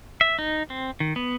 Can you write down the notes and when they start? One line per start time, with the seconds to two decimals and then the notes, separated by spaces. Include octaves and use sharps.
0.21 E5
0.39 D#4
0.70 C4
1.00 D#3
1.16 B3